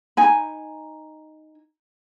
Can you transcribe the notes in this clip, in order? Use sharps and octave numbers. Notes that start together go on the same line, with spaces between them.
D#4 G#5 B5